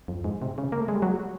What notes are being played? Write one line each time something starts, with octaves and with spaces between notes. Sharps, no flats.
F2
G#2
C3
C#3
A#3
A3
G#3
G3
F#3